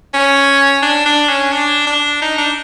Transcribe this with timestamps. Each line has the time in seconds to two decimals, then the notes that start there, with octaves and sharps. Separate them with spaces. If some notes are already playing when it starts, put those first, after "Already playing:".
0.13 C#4
0.82 D4
1.05 D4
1.29 C#4
1.52 D4
1.87 D4
2.22 D#4
2.38 D4